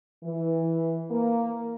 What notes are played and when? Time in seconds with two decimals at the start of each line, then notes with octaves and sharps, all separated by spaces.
0.23 E3
1.11 A#3